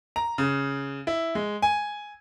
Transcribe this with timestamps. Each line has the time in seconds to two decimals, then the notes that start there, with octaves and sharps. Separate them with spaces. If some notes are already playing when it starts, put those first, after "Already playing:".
0.16 A#5
0.38 C#3
1.07 E4
1.35 G#3
1.62 G#5